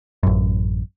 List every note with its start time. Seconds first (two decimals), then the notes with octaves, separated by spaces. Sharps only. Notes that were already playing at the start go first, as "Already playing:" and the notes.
0.23 A1 F#2